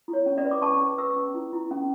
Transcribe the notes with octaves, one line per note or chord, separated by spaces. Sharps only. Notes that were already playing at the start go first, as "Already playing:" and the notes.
E4
C#5
C#4
D5
B4
D6
C#4 A5 C#6
B4
B4 C#6 E6
C#4
E4
E4
C#4